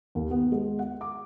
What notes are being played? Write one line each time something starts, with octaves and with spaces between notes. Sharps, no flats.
D#2
B3
G#3
F#5
D6